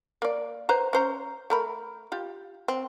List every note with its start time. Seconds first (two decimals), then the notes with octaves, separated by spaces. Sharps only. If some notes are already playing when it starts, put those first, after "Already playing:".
0.22 A#3 D5
0.69 B4 C5 A#5
0.93 C#4 C5 A#5
1.50 A3 A#4 B5
2.12 F4 G4
2.68 C4